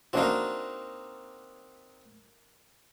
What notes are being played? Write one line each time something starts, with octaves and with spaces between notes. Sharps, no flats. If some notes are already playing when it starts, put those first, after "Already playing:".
A#3 C4 D4 D#4 F#4